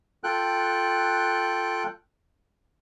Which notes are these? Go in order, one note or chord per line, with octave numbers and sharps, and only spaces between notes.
F4 A4 G5 F#6